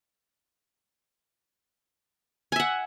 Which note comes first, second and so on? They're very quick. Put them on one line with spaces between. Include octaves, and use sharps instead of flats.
G#5 E5 F#5